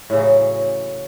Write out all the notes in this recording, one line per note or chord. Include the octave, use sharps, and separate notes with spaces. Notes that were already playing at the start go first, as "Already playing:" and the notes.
A2 C#3 E3 F#3